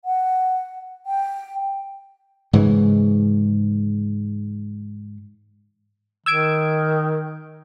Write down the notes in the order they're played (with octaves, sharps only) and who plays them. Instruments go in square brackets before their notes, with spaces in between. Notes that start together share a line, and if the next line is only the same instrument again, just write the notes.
[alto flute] F#5
G5
[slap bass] G#2 C#3 E3
[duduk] D#3 [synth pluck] E6 G#6 D7